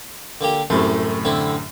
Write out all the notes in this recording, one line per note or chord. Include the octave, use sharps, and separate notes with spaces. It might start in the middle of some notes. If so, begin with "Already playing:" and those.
D3 A#3 G4
C2 F#2 A2 C3 A3 C6
D3 C4 E4